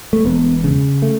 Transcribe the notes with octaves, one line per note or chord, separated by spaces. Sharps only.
A3
E1 B3
C#3
A3